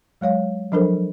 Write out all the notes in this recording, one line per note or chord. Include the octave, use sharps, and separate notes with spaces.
F#3 G#3 C#5 F5
F3 F#3 D4 A4 A#4 C5